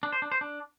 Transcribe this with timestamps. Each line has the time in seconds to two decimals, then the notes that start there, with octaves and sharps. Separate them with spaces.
0.03 D4
0.12 C5
0.22 D4
0.32 C5
0.41 D4